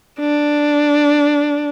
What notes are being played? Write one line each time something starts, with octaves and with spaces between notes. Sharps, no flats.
D4